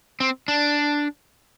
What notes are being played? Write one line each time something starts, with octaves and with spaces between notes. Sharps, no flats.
C4
D4